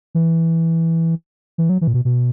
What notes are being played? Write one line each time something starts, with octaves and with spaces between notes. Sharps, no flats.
E3
E3
F#3
E3
A#2
B2
B2